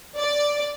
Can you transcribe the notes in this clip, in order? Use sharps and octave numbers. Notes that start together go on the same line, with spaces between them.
D5